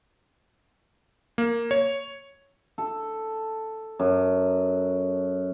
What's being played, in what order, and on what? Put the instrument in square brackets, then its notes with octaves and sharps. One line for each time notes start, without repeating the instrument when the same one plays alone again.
[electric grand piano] A#3
C#5
[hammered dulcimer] A4
F#2